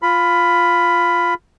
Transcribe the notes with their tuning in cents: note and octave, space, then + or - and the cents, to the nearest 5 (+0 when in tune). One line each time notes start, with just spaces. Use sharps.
F4 +0 B5 +10